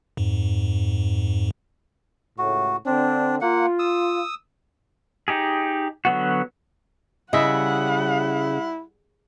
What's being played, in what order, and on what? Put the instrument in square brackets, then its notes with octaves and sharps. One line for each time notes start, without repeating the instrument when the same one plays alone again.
[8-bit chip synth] F2 G#2
[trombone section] C#2 A2 [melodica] F#4
[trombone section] D3 C4 [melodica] D4
[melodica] A#3 F#5 [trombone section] F4
[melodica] D#6 E6
[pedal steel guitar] D#4 G4 G#4
D3 F#3 B3 F#4
[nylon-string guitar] C#3 [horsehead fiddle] G3 F#5 [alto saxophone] E4 [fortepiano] D#5 E5